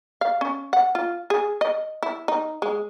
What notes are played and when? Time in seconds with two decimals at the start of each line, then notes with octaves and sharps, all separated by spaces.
0.21 F5
0.41 C#4
0.73 F#5
0.95 F4
1.30 G#4
1.61 D#5
2.03 E4
2.28 D#4
2.62 G#3